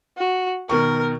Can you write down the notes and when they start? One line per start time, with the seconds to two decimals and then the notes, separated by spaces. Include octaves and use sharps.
0.17 F#4
0.69 B2 D#3 A#4 C#6